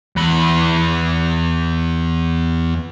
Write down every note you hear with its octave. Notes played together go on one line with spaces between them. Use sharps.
E2 B5